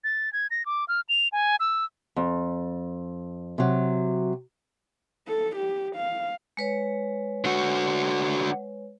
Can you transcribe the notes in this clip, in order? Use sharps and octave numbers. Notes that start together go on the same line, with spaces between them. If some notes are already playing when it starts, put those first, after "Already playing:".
A6
G#6
A#6
D6
F6
F7
G#5
E6
F2
C3 F#3
A4
G4
F5
G#3 B4 C#5
D3 F#4